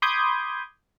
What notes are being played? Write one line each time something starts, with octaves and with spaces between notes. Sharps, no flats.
B5 C6 D6 D#6 G6 G#6